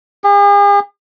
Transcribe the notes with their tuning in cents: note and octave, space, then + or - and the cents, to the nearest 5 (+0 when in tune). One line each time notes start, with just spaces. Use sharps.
G#4 -45